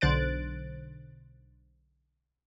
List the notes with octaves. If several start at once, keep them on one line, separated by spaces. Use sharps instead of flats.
B1 D3 C5 F#6 A6 D7